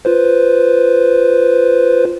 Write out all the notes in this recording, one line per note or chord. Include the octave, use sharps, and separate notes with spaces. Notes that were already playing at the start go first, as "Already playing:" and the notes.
F4 B4 C5